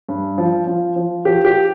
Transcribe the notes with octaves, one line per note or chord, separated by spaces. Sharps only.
G2
F3
F3
F3
F3 G4
G4